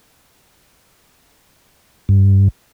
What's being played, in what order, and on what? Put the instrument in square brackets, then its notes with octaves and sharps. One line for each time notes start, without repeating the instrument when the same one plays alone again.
[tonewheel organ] G2